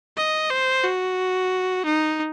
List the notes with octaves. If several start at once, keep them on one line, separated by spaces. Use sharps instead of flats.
D#5
C5
F#4
D#4